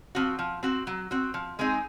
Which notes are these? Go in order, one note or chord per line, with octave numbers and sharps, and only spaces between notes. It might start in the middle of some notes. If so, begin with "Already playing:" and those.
F3 C4 F#4
F3
C4 F#4
F#3
C4 F#4
F3
G#3 C4 D#4 G#4